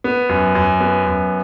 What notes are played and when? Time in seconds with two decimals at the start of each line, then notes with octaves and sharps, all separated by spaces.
0.04 B3
0.29 F#2
0.55 F#2
0.80 B3
1.06 F#2